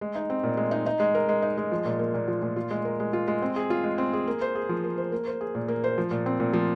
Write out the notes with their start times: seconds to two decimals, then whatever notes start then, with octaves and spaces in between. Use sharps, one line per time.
0.01 G#3
0.15 D#4
0.30 C4
0.44 A#2
0.57 G#3
0.71 D#4
0.86 D#4
1.00 G#3
1.15 A#4
1.29 G#3
1.42 D#4
1.57 G#3
1.72 F3
1.85 A#2
1.99 A#3
2.14 A#2
2.28 F3
2.42 A#2
2.56 F4
2.71 G#3
2.85 A#4
3.00 G#3
3.13 F4
3.27 G#3
3.42 C4
3.56 G#4
3.70 F4
3.84 G#3
3.98 C4
4.13 G#4
4.27 A#3
4.41 C5
4.55 G#4
4.69 F3
4.84 A#3
4.98 C5
5.12 A#3
5.27 C5
5.41 G#4
5.55 A#2
5.68 A#3
5.84 C5
5.98 F3
6.11 A#2
6.26 C4
6.40 A#2
6.53 F3